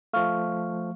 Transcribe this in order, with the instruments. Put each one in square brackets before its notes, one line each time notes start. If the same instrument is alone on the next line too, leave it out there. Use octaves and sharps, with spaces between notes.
[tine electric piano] F3 A3 [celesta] F5 C#6 F6